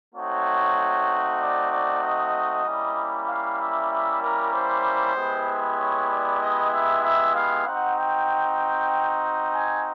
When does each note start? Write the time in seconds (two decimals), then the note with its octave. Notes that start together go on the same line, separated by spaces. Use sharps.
0.13 A3 C4 D#4 F#4 C#5
1.40 D5
1.70 D5
2.01 D#5
2.64 G3 A#3 C#4 E4
3.27 F5
3.58 E5
3.90 E5
4.21 A#4
4.52 C5
5.14 G#3 B3 E4 G4
5.78 C#5
6.09 D5
6.40 D#5
6.71 E5
7.02 E5
7.34 F5
7.65 C4 D#4 F#4 F#5
7.97 G5
9.53 G#5